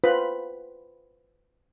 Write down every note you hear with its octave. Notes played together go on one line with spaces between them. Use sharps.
F4 B4 C5 B5